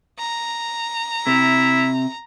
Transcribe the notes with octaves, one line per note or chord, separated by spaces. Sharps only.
A#5
C3 E4